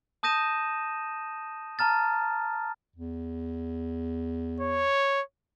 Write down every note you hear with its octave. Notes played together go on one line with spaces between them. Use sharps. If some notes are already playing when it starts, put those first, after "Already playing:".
A5 D#6 G6 A#6 D#7 E7
A5 A#5 F6 A6
E2
C#5